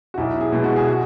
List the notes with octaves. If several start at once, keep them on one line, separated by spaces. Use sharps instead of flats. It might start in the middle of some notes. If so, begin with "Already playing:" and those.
F#4
B1 E4
G#4
B2 G#3
F#4
G#4
F#4